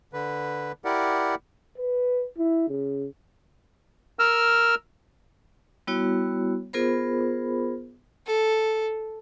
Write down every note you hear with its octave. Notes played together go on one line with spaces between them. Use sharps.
D3 B4
E4 G4 A#4 D5 F#5
B4
E4
C#3
A#4 E6 F6
G3 B3 E4 F#4 C#5
B3 F4 G#4 A#4 C5 B5
A4